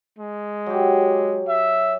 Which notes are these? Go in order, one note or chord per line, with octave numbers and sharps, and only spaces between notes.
G#3
F#3 G4
E5